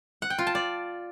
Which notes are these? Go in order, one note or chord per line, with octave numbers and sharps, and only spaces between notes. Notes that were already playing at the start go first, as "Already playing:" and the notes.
F#5
G5
F4
A5
D5